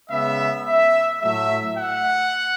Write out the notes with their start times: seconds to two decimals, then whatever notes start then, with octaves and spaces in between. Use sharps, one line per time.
0.10 C#3 G#3 B3 E5
0.66 E5
1.21 A2 F#3 A3 E5
1.76 F#5